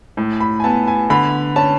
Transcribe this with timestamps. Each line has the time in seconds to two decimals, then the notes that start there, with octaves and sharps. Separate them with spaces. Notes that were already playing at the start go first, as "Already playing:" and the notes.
0.17 A2
0.40 B5
0.60 G#5
0.64 B3 A5
0.88 G#5
1.10 D3 B5
1.56 C#4 A5